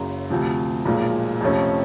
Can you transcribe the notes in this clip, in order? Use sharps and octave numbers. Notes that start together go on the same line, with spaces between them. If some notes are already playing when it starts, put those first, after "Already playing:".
Already playing: F#1 F#2 C#3
D2 C3 F3
B1 A#2 F3 G#3
F2 C3 F3 A3 C#4